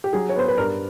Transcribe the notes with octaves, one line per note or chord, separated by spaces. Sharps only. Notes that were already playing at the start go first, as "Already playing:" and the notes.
G4
F#3 G#4
C#5
B3 C5
B4
G2 A#4